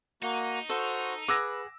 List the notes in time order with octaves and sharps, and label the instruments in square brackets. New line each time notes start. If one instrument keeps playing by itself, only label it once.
[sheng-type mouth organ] A#3 F#4 [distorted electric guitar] D#4
[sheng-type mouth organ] F#4 C5 C#6 [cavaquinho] A4
[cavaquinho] G#4 F#5 [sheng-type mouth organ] B4 [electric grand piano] D6 E6 A#6